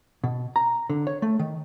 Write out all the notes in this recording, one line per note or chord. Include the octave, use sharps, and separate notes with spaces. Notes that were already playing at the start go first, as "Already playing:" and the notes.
B2
A#5
D3
C#5
A3
D#3